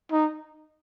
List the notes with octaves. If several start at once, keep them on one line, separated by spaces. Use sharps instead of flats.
D#4